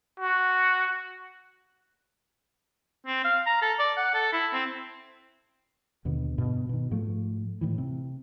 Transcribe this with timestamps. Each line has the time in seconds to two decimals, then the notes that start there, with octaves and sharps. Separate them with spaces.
0.20 F#4
3.07 C4
3.25 F5
3.47 A#5
3.62 A4
3.79 D5
3.97 F#5
4.14 A4
4.33 E4
4.53 C4
6.05 D#2 B2 D3 B3
6.38 G2 B2
6.69 B2 D#3
6.91 G#2 F3 A3
7.61 A2 D#3 E3
7.78 C3